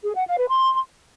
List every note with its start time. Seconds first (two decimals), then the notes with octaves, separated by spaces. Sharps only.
0.04 G#4
0.15 F#5
0.26 F5
0.37 B4
0.48 C6